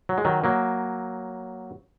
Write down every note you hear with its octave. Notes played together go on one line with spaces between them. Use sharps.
F#3
G#3
D#3 F#3
F#3 A#3